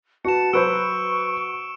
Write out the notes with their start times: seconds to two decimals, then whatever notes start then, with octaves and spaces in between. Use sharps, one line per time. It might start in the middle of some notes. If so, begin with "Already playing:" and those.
0.25 F#4 B4 A5 C#7 E7
0.53 F#3 B4 C5 C#6 E6 D7